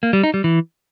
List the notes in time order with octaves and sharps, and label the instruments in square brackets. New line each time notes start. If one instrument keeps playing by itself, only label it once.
[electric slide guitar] A#3
G3
D#4
G3
E3